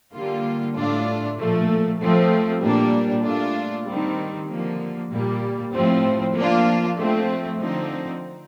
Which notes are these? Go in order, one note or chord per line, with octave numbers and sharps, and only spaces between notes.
D3 G3 A#3 F4
A2 A3 D4 F4
A#2 F3 A3
F3 A3 C4
A#2 G3 A#3 D4
A#2 A3 D4 F4
D#3 G3 C4
D3 F3 A#3
A#2 G3 A#3
A2 F3 C4
F3 A#3 D4 F4
F3 A3 C4
D3 F3 C4 D#4